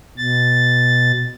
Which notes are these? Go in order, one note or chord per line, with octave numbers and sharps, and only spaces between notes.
B2 A6